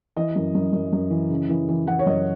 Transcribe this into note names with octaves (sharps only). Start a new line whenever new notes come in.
E3 D#5
F#2
F#2
F#2
F#2
E3
C#3
E3
E3
E3 F#5
C#5
F#2 D#5